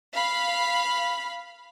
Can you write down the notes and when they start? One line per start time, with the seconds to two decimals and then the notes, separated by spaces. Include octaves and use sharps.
0.14 F5 B5